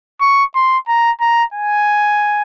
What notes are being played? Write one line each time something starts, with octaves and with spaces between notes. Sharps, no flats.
C#6
C6
A#5
A#5
G#5